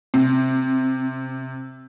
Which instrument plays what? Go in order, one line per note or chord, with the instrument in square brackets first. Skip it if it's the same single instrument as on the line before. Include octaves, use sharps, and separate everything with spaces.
[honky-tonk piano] C3 [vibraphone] C4